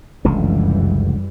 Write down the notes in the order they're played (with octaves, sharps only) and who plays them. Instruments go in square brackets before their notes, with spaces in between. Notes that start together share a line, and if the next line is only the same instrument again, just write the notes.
[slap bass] F1 C#2 D3 [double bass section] F#2 E3 G3